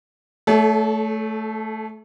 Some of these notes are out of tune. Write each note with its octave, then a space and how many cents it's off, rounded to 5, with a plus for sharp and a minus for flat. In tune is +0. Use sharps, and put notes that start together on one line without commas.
A3 +0 A4 -35 C#5 +35